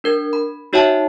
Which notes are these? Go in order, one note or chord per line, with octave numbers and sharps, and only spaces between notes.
D4 A#4 G#6
B5
D#4 F#4 C#5 E5 G5 A5